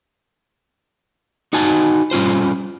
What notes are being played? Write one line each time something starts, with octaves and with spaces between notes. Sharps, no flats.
D#4 F#4 C5 G#5 A5
G3 C#4 F4 C5